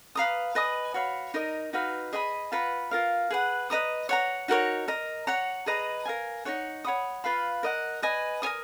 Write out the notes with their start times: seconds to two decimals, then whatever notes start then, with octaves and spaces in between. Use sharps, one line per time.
0.15 B4 F5 A#5 D#6
0.55 B4 D#5 G#5 D#6
0.94 F#4 C#5 F5 B5
1.34 D#4 A#4 D#5
1.73 D#4 F#4 B4 F5
2.13 G#4 D#5 F#5 B5
2.52 F4 B4 F#5 A#5
2.91 F4 A#4 F5
3.30 G#4 B4 F#5
3.70 B4 D#5 A#5 D#6
4.09 C#5 F#5 A#5
4.48 D#4 F#4 A#4 C#5
4.88 A#4 D#5 A#5
5.27 C#5 F#5 A#5
5.66 G#4 B4 D#5 A#5
6.06 A#4 F5 G#5
6.45 D#4 G#4 C#5 F#5
6.84 C#5 F#5 B5 D#6
7.24 F4 B4 F5 B5
7.63 A#4 D#5 F#5
8.02 B4 D#5 G#5
8.42 A#4 C#5 G#5 D#6